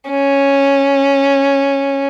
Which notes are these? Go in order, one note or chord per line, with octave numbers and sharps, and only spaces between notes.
C#4